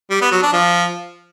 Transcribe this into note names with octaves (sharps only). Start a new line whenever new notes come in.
G3
B3
F#3
D4
F3